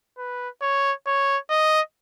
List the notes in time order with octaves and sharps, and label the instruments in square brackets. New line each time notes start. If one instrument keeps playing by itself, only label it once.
[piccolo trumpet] B4
C#5
C#5
D#5